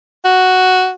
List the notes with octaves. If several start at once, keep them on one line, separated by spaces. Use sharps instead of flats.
F#4